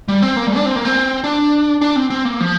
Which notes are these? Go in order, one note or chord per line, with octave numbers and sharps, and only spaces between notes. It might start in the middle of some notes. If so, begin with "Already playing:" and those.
G3
C4
A#3
G3
D4
C4
A#3
C4
D4
D4
C4
C4
A#3
F3